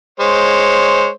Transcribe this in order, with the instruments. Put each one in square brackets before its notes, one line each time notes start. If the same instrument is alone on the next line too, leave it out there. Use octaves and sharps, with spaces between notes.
[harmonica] G#3 C5 C#5